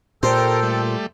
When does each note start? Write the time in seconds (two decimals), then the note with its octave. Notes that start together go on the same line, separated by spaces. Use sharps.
0.23 A#2 G4 A4 A#4 C5 G5
0.63 G3 A3